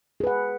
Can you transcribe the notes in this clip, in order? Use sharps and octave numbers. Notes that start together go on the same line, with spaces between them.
G#4 B4 F#5